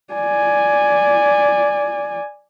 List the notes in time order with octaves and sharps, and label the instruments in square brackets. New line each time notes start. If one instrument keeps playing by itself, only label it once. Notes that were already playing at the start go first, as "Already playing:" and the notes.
[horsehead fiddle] D5 G#5